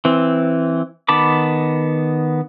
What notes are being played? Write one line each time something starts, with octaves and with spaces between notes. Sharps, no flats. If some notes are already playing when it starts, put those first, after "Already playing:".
E3 C4
D#3 B3 A5 B5 D6